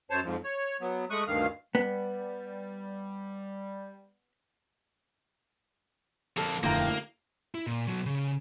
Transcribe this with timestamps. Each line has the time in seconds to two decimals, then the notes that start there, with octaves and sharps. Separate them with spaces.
0.10 F#2 C5 C#5 A5
0.24 F2 G#2 F3
0.44 C#5
0.81 F#3 B3
1.10 G#3 A3 C#6 D#6 F#6
1.27 D2 G2 D#3 F5
1.75 G3 B3
6.37 F2 A#3 A4
6.63 D#1 F2 A2 D3 A#3 F4 G5 A#5
7.55 E4
7.67 A#2
7.87 B2 F#3
8.06 C#3